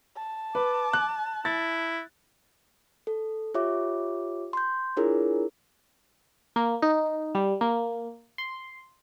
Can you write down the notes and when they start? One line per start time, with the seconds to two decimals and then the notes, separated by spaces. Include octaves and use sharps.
0.17 A5
0.55 B4 D6
0.93 F#6
1.45 E4 A6
3.07 A4
3.54 F4 G4 C#5 E5 D6
4.53 C6 G6
4.97 D4 E4 F4 G#4 A#4 C#5
6.56 A#3
6.82 D#4
7.35 G3
7.61 A#3
8.38 C6